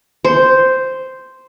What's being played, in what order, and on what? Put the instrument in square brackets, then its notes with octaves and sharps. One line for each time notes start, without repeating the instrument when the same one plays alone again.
[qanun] C5